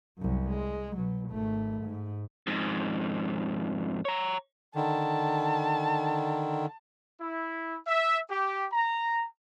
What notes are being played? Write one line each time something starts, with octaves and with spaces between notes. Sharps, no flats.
C2 F#2
G#3
B2 F#3
G#1 A3
G#2
F2 G#2
C#5 A#5
D3 D#3 A5
E4
E5
G4
A#5